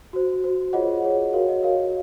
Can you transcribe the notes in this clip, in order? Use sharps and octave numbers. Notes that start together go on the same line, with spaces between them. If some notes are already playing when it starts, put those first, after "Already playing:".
F#4 C5
F#4 C5
F4 G#4 C#5 D#5 F#5
F4 G#4 C#5
F#4 A#4 C#5 F5
D#5
F#4 A#4 C#5 F5